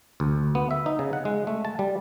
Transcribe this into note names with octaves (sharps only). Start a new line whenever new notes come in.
D2
B3
E5
D#4
C#3
F#5
G#3
A3
A5
G3